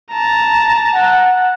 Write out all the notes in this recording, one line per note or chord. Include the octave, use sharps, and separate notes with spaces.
A5 A#5
F#5